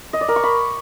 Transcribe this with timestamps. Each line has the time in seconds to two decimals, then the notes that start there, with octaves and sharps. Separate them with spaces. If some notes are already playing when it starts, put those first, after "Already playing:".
0.13 D#5
0.21 D5
0.28 A#4
0.36 C#6
0.43 B5